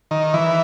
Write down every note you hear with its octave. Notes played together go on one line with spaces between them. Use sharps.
D#3
E3